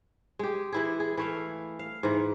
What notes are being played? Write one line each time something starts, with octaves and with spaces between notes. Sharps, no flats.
G#3 G4
E3 E4 G#4
G#4
E3 A3 F5
F5
G#2 E3